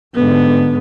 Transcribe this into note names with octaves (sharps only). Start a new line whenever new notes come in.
G#2 D3 B3